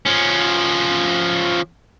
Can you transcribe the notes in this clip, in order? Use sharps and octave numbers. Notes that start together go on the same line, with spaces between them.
F3 C#4